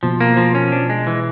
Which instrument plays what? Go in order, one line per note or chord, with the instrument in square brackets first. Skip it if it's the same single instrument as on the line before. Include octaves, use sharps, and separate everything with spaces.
[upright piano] B2 [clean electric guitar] F3
[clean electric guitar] A#3
F3
C#4
D4
G#3
E3